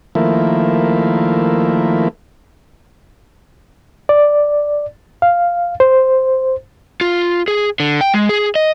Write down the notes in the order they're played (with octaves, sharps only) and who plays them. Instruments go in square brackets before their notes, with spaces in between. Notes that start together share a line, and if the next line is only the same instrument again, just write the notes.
[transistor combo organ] D#3 F3 A3 A#3 E4
[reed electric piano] D5
F5
C5
[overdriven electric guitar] F4
G#4
D3
G5
G#3
G#4
D#5